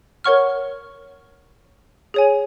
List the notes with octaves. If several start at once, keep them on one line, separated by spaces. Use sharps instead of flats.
A#4 C#5 F#5 C#6 F6
G#4 C#5 G#5